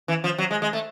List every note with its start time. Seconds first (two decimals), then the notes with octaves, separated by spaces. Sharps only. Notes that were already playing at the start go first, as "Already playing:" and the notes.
0.08 E3
0.24 F3
0.38 F#3
0.51 G#3
0.62 G#3
0.73 A3